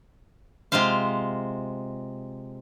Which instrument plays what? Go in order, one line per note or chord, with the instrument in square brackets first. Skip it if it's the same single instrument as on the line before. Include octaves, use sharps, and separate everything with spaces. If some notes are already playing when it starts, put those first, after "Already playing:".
[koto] C3 G#3 F4 C5 F5